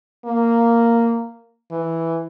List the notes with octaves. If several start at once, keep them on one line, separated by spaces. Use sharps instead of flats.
A#3
E3